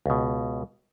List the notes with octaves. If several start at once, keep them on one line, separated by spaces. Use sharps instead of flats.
C#2 B2